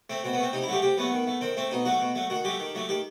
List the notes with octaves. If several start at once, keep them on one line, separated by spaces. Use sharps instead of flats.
A3 C4
B2 C4
B3
A3 C4
C3 D#4
E4
F#3 A3 G4
C3 G4
F#3 A3 B3
D#3
A3
D#3 C4
A3 C4
B2 D#4
F#3 A3 F#4
B2
F#3 A3
D#3 F#4
F#3 A3 G4
D#3
F#3 A3
D#3 G4